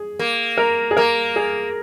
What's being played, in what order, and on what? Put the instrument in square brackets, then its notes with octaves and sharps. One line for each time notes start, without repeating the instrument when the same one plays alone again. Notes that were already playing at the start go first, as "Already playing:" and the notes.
Already playing: [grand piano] G#4
[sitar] A#3
[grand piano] A#4
G#4
[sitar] A#3 [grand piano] A#4
[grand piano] G#4